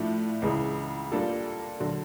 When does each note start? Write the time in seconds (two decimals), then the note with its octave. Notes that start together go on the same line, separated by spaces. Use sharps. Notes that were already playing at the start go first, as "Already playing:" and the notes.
Already playing: A2 F3 A3 D4
0.42 C#2 C#3 E3 G#3
1.11 G3 A#3 D4 F4 A4
1.80 D3 F#3